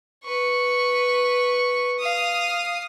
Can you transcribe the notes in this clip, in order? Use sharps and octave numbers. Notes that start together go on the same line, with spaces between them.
B4 C#6
F5 D#6